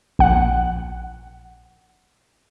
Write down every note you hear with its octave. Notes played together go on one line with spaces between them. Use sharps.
A#1 F#5